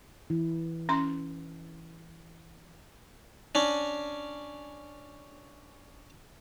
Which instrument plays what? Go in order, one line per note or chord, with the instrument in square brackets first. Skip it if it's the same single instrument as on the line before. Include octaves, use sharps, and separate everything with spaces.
[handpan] E3 E4
[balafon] C#4 C6
[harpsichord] C#4 D4